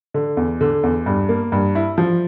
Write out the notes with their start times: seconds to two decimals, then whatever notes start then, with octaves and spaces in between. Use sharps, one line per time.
0.14 D3
0.37 E2
0.61 D3
0.83 E2
1.06 G2
1.29 A#3
1.52 G2
1.75 E4
1.98 F3